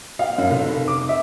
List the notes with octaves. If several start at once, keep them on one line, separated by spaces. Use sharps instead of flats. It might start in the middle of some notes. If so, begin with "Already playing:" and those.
F5
F#2
F1
D6
E5